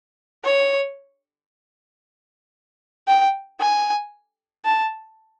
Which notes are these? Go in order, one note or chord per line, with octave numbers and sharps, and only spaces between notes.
C#5
G5
G#5
A5